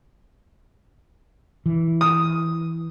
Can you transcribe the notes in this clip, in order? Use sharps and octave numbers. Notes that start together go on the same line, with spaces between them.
E3
D#6